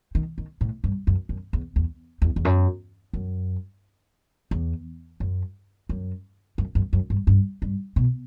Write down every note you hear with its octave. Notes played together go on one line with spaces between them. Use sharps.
D#3
D#3
A2
G2
F#2
F#2
E2
E2
E2
E2
F#2
F#2
E2
F#2
F#2
F#2
F#2
F#2
G2
G2
G2
B2